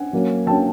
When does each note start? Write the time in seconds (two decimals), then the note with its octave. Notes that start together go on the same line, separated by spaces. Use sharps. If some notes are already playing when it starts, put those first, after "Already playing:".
Already playing: F#5 G#5
0.13 F#3 A#3 C#4
0.46 F#3 A#3 C#4 G5 A5